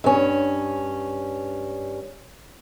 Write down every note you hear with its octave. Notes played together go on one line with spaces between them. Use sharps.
G2 C#4